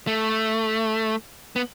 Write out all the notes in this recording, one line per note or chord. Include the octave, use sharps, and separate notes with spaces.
A3
B3